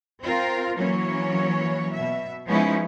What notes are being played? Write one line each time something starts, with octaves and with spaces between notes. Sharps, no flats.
C4 F4 A#4
E3 F#3 A#3 C#4 C#5
B2 E5
F3 G#3 B3 C#4 D#4 E4